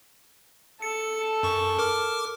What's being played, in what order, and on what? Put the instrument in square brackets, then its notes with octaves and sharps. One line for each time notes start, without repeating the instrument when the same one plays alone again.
[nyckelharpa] A4 A5 [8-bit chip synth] C#7
[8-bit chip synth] F#2 C#6
A#4 D6 F6